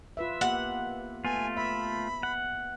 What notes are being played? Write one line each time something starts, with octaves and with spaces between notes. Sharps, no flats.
F4 B4 E5
A#3 B3 G4 F#5
A3 B3 F4 G#5
E5 B5
F#5